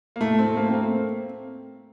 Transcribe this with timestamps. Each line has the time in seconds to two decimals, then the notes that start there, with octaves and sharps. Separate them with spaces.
0.16 A#3
0.20 A2 A3
0.39 C4
0.45 A3
0.56 A#3
0.68 C4
0.73 A#3